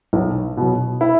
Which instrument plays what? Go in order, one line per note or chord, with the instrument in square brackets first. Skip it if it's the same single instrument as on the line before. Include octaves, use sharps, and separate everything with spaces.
[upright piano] B1
B2 F#3
E4